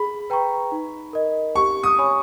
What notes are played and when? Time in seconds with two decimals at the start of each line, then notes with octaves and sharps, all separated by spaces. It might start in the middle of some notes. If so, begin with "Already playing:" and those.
Already playing: G#4 B5
0.30 B4 G5 A#5 C#6
0.72 D#4
1.13 A#4 D#5
1.56 G4 C#6
1.83 D#6
1.98 C#5 G#5 B5